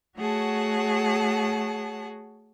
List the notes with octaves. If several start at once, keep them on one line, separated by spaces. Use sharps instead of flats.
A3 F#4 G#4 C#5 F#5 A5